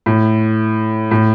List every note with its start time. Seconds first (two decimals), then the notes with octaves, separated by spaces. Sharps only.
0.06 A2
1.11 A2